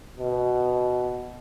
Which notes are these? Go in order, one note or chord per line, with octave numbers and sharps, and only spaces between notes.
B2